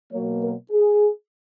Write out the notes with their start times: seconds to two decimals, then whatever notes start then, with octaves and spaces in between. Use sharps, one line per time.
0.12 B2 F#3 A#3 C#5
0.41 A#4
0.72 G#4